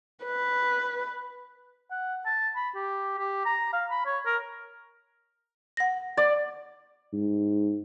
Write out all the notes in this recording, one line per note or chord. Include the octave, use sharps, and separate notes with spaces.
B4
F#5
A5
B5
G4
G4
A#5
F5
B5
C#5
A#4
F#5 A#6
D5
G#2